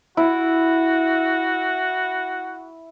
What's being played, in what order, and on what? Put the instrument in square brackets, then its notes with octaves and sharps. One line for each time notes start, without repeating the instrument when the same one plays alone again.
[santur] E4 [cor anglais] F#4